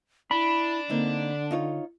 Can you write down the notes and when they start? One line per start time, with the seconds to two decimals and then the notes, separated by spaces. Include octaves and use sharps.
0.31 D4 E4 B5
0.90 D3 A#3 C4 D#4
1.51 D#4 F4 C#5